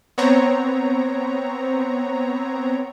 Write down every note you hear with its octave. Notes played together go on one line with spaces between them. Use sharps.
B3 C4 C#5 A#5